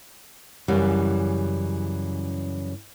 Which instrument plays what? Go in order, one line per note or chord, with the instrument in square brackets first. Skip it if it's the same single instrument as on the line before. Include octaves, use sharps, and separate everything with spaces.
[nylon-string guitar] F#2 C#3 E3 G3